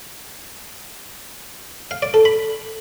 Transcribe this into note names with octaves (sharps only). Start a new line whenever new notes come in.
F5
D5
A4
B5